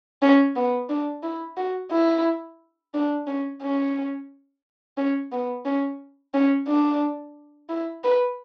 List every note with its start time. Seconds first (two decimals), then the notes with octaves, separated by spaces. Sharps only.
0.22 C#4
0.56 B3
0.89 D4
1.23 E4
1.57 F#4
1.91 E4
2.94 D4
3.27 C#4
3.62 C#4
4.97 C#4
5.32 B3
5.65 C#4
6.34 C#4
6.68 D4
7.69 E4
8.04 B4